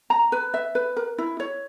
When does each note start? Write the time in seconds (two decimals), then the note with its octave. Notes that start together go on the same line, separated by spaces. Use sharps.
0.10 A#5
0.32 B4
0.54 E5
0.75 B4
0.97 A#4
1.18 E4
1.40 C#5